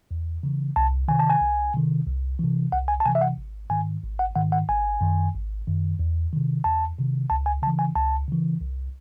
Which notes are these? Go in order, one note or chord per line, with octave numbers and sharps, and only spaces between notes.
E2
C#3 E3
C2 A5
C3 D#3 G#5
A5
G#5
C2
C3 D#3
C2
C3 E3
C2 F#5
G#5
A5
C3 E3 G#5
E5
F#5
G#1
G#2 D#3 G#5
G#1
F#5
G#2 D#3 F#5
F#5
G#1 G#5
F#2 D#3
G#1
F#2 D#3
E2
C3 D#3
E2 A5
C3 D#3
C#2 A5
G#5
C#3 E3 A5
G#5
C#2 A5
C#3 E3
C2